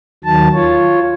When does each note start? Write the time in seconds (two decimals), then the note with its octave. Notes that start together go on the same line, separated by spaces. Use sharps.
0.24 D#2 D#3 F#3 A5
0.54 F4 C#5